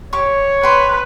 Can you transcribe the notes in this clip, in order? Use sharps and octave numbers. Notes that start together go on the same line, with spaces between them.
G4 C#5 C#6
B4 G5 C6